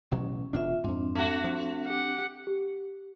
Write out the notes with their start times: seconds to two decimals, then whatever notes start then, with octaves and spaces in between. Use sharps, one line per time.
0.11 A1 B2 F#3 C#4
0.53 E1 B2 D4 F4 E5
0.84 F2 G#2 C4 D4
1.15 A3 F#4
1.44 F3
1.87 G4 F#5
2.47 G4